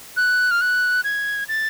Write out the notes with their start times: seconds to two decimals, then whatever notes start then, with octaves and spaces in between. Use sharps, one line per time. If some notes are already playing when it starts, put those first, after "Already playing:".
0.17 F#6
0.51 F6
0.61 F#6
1.04 G#6
1.49 A6